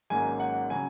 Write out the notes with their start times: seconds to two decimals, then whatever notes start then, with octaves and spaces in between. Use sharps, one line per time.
0.10 G#1 G#2 F#3 A#3 C#4 G#5
0.40 F#5
0.70 C#3 F#3 G#5